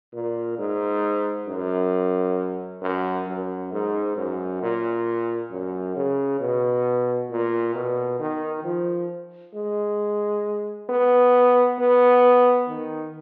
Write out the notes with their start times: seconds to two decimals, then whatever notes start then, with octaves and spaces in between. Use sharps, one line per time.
0.14 A#2
0.58 G#2
1.48 F#2
2.82 F#2
3.28 F#2
3.72 G#2
4.17 F#2
4.62 A#2
5.51 F#2
5.96 C#3
6.40 B2
7.30 A#2
7.75 B2
8.20 D#3
8.64 F3
9.54 G#3
10.89 B3
11.79 B3
12.68 D#3